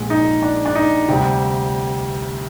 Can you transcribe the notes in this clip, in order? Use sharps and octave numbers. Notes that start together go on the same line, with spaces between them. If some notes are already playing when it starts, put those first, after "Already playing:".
Already playing: A#1 A#2 G#3
D#4
D4
D4
D#4
D2 C3 G3 G4